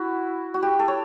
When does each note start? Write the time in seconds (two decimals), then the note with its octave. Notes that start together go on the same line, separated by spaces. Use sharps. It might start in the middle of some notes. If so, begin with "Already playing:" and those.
Already playing: E4 F#4
0.54 F#4
0.62 G4
0.79 A4
0.88 C#5